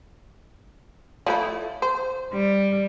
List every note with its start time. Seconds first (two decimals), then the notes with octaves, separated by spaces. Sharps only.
1.26 F3 A3 E4
1.82 C5
2.34 G3